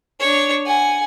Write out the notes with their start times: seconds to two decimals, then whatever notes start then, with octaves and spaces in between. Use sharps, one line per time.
0.19 D4 C#5
0.66 F#5 G#5